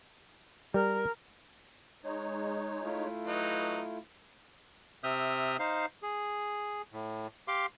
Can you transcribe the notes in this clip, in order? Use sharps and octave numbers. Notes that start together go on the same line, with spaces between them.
G3 A#4
G#3 D#4 C#5
A3 E4 F4
F#3 D#4 B4
C3 C4 E5 D#6 F6 G6
D#4 C5 F5
G#4
A2
G4 F5 C6 D6